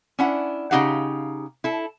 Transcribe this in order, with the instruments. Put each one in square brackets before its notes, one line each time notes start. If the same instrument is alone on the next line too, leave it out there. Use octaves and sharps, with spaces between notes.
[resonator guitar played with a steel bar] C#4 D4 E4 F#5
C#3 D4 D#4 G4 F5 F#5
E4 A4